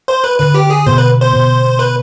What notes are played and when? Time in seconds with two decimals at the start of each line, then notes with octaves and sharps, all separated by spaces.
0.08 C5
0.24 B4
0.39 D3 B4
0.54 G4
0.70 G#4
0.87 B2 C5
0.98 B4
1.21 C5
1.33 B2
1.79 B4